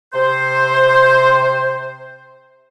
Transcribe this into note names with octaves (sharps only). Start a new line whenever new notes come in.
C3 C5